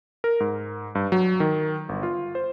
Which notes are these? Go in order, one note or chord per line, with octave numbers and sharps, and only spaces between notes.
A#4
G#2
G2
F#3
D#3
G1
F4
C5